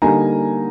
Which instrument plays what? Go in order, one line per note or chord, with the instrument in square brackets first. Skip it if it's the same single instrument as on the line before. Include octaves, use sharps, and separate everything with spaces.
[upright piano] D3 G3 A#3 D#4 G#5 A#5